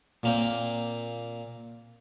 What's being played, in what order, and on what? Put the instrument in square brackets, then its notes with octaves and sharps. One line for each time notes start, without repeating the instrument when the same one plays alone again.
[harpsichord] A#2 A#3 C4